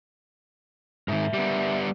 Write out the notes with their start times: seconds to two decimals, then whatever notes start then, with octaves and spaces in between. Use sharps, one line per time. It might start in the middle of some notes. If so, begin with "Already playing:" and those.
1.08 G#2 D#3 A#4 E5
1.33 G3 B3